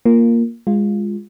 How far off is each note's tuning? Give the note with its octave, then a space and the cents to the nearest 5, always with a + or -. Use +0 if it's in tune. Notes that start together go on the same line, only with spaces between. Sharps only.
A#3 +0 F4 -5
G#3 -15 F4 +0